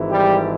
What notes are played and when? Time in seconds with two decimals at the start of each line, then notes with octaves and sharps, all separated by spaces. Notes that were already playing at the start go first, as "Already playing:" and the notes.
Already playing: G#1 G#2 E3
0.10 G3 G4